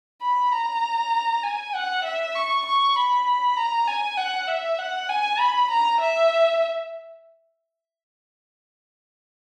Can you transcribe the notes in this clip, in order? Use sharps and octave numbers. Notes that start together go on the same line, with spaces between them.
B5
A#5
G#5
F#5
E5
C#6
C#6
B5
A#5
G#5
F#5
E5
F#5
G#5
B5
A#5
E5